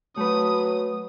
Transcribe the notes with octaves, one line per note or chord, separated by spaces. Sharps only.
F#3 A3 B4 D#6